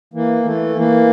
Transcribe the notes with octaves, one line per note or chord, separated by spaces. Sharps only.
E3 A#3
E3 A3
E3 A#3